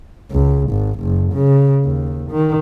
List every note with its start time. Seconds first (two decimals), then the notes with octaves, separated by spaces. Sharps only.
0.32 C#2
0.71 G#1
1.00 F#1
1.33 C#3
1.84 D#2
2.31 D#3